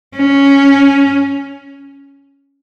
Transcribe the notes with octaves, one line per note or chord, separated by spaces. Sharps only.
C#4